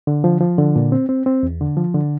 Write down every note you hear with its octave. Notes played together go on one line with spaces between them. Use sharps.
D3
F3
F3
D3
A#2
C4
C4
C4
E2
D3
F3
D3